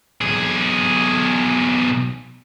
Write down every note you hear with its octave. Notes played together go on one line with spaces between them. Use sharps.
B1 G#4